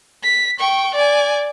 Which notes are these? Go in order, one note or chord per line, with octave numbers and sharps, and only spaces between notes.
B6
G5 C#6
D5 G#5